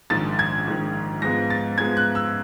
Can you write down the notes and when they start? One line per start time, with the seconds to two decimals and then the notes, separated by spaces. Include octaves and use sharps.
0.10 A#1 G#2 D#3 A6
0.39 G#6
0.67 A#1 G#2 D#3
1.22 G#2 F3 G#3 B3 A#6
1.50 A6
1.78 G#2 F3 G#3 B3 G#6
1.97 F#6
2.15 E6